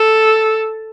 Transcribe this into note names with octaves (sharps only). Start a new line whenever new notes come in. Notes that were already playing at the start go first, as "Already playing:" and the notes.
Already playing: A4